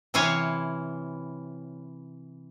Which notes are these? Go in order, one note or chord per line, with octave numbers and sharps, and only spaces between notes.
C3 E3 E4 C#5 F5 G#5